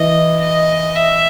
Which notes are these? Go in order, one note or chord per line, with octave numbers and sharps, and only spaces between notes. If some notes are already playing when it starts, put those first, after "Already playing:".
Already playing: E3 D#5
D#5
E5